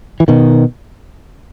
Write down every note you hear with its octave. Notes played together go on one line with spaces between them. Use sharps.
E3
B2 D#3